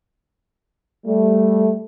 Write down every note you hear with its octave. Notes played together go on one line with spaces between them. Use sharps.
G3 A3